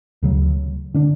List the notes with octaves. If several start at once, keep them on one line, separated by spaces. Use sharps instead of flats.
D2 C#3 F#3
D3 G3 D4